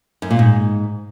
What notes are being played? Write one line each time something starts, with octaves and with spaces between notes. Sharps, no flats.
F#2
A#2
G#2